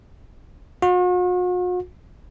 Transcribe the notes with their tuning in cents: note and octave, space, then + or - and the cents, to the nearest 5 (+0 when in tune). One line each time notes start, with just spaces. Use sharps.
F#4 -45